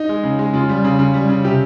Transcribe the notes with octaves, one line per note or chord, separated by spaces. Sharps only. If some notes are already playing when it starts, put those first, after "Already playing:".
Already playing: D#4
G#3
C#3
G#3
C#3 F4
G3
C#3
C#3
G3
C#3
C3 G4